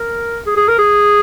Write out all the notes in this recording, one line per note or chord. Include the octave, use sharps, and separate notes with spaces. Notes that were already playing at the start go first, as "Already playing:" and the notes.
Already playing: A#4
G#4
G#4
A#4
G#4